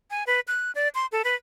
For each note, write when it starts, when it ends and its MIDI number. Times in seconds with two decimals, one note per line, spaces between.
0.11 0.24 80
0.27 0.40 71
0.48 0.71 90
0.75 0.88 74
0.95 1.06 84
1.12 1.22 69
1.25 1.35 71